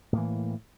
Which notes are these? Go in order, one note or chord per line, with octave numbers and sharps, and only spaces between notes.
A2 E3 A#3